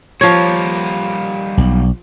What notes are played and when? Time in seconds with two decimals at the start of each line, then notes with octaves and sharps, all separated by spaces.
0.21 F3 G3 A#3 C#5
1.57 B1